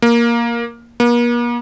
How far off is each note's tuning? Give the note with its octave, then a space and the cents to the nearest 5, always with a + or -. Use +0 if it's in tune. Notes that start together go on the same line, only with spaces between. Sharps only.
A#3 +10
A#3 +45